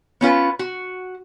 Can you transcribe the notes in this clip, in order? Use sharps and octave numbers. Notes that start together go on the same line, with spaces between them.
B3 C#4 F4 B4
F#4